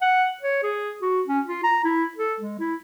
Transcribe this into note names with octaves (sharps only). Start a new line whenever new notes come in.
F#5
C#5
G#4
F#4
C#4
F4
A#5
E4
A4
G#3
E4